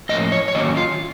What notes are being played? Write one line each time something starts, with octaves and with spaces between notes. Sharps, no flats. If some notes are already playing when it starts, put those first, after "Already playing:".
A2 F3 A#3 C#4 D#5
C#5
C#5
D#3 F#3 A#3 C#4 D#5
F4